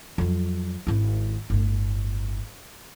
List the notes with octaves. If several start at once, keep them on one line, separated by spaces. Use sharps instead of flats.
F2 F#3
G#1 E4
G1 A2